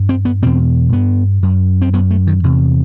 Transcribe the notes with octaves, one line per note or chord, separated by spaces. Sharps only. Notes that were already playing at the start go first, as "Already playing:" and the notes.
Already playing: G2
C4
B3
E2 B2 C4
G2 B3
F#2
C4
F#2 B3
A3
D#3
E2 C3